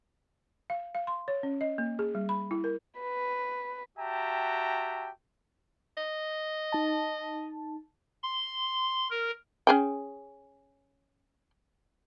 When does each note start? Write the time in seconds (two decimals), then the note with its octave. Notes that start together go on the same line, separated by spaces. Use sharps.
0.70 F5
0.95 F5
1.07 C6
1.28 C#5
1.43 C#4
1.61 D#5
1.78 A#3
1.99 G#4
2.15 G3
2.29 B5
2.51 E4
2.64 A#4
3.00 B4
3.98 F#4 G4 E5 G5 A5 A#5
5.97 D#5
6.72 D#4 A5
8.23 C6
9.11 A#4
9.67 C#4 G#4 G5